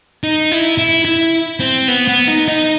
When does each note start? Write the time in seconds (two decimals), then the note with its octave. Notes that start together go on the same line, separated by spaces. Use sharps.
0.24 D#4
0.52 E4
0.78 E4
1.05 E4
1.60 C4
1.88 B3
2.08 B3
2.27 D#4
2.48 D#4